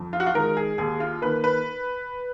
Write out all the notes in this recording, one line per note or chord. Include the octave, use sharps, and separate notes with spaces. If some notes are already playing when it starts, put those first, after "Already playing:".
Already playing: F2
F4
F#4
F4
D#3 G#3 A#4
G#4
D#2 G#4
F4
D#3 A#3 B4
B4